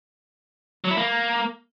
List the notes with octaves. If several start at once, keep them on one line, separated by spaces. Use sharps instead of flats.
F#3
E4
A#3